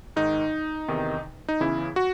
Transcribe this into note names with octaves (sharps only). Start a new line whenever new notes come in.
G#2 D#3 D#4
E2 C3 D#3
D#4
E2 C#3 E3 E4
F#4